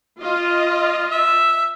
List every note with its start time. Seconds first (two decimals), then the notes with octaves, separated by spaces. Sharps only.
0.20 F4 D#5
1.11 E5